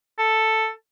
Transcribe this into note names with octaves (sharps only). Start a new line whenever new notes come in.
A4